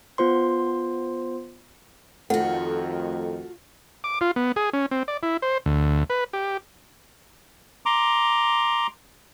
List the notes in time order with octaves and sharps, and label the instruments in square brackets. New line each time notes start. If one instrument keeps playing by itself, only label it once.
[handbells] B3 F4 C5 C6
[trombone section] F2 D#3 [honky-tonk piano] A3 [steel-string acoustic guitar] F4 F#4 [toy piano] F#5
[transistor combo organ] D6
F4
B3
G#4
C#4
C4
D5
E4
C5
D2
B4
G4
[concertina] A#5 C6 D6